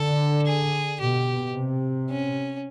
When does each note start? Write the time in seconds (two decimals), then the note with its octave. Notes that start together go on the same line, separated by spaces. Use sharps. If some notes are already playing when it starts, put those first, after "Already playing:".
Already playing: D3 A4
0.46 G#4
1.00 B2 G4
1.55 C3
2.10 C#4